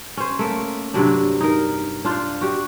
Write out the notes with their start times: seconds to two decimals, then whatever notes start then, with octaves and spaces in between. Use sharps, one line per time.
0.17 C#4 C5
0.39 A3 A#3
0.94 G2 C3 F#3 D4
1.41 D#4 A#4
2.05 D4 F4 C5
2.41 F#4 G4